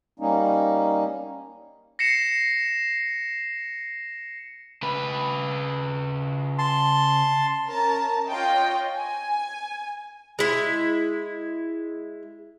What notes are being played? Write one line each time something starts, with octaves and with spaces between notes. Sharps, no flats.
G3 A#3 C#4 D#4
A#6 C7 C#7 E7
C#3 B4
A5 C6
C#4 A#4 A5 A#5
F4 C#5 D#5 G5
G#5
G#3 E4